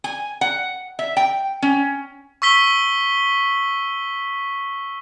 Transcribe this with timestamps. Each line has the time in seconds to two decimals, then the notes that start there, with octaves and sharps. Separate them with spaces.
0.04 G#5
0.41 F#5
0.99 E5
1.17 G5
1.62 C#4
2.42 C#6 E6 B6 G7